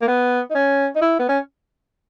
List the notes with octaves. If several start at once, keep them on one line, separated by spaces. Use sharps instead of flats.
A#3
B3
D#4
C#4
D#4
E4
B3
C#4